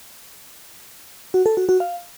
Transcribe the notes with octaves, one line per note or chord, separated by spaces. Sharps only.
F#4
A4
F#4
F#4
F5